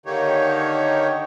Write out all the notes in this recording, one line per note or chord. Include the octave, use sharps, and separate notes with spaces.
D3 D#3 A#3 D#4 G4 C#5